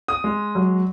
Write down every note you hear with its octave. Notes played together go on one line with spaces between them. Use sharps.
D#6
G#3
F#3